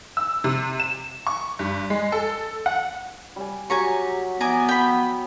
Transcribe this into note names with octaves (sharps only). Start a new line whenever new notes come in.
E6
C3
E7
C#6
G2
G#3
A4
F#5
G3 D5 G#5
F#3 F#4 G4 G#5 A#5 C#6
B3 D5 G#5 A#5
G5 B5